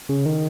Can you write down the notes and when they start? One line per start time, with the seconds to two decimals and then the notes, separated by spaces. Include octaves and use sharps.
0.09 C#3
0.26 D#3